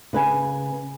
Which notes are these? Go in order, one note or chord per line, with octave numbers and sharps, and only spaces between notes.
C#3 B4 G#5